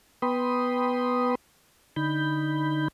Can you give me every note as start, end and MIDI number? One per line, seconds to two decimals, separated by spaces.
0.22 1.35 59
0.22 1.35 71
0.22 1.35 79
0.22 1.35 83
0.22 1.35 84
0.22 1.35 87
1.96 2.88 50
1.96 2.88 63
1.96 2.88 83
1.96 2.88 91